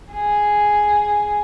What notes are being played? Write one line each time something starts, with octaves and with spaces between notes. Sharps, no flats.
G#4